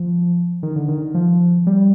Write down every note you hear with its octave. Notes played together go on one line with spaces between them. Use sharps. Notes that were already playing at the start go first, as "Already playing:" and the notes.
Already playing: F3
D#3
D3
D#3
D#3
F3
G3